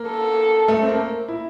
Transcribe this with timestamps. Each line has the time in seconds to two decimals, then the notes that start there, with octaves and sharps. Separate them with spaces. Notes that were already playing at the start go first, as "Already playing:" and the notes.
Already playing: A#3
0.08 A4
0.68 A3
0.82 C4
0.88 A#3
1.28 E4